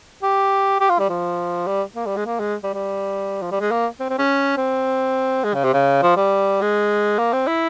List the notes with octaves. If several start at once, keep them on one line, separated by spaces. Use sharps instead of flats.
G4
G4
F4
G3
F3
G3
A#3
G3
G#3
A#3
G#3
G3
G3
F3
G3
G#3
A#3
C4
C4
C#4
C4
G#3
C#3
C3
C#3
F3
G3
G#3
A#3
C4
E4